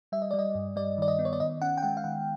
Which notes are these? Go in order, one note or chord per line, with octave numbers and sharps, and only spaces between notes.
G3 E5
D#5
G3 D5
D#5
G2
G3 D5
D#3 D5
D#5
B3
C#5
D5
D#3 D#5
C#4 F#5
G5
G#3 F#5
F5
D#3 F#5